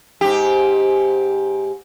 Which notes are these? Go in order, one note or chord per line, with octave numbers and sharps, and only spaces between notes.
G#2 G4